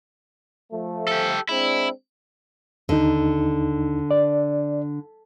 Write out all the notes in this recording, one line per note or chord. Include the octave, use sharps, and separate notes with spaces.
F3 A3
G4 A4
G#3 C4 D4 E4
D#2 D3 D#4
D5